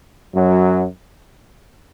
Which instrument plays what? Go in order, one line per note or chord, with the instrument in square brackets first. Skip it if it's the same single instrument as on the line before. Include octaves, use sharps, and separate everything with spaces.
[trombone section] F#2 F#3